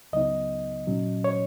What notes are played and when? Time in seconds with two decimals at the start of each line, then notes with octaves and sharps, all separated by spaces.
0.13 C#2 C#3 F#3 B3 D#4 D#5
0.87 A#2 F#3 C#4
1.24 C#5